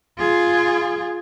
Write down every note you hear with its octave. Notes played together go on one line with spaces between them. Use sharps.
F4 G#4